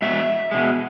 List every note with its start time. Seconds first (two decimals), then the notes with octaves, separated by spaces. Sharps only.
0.02 B2 G#3 E5
0.52 B2 G#3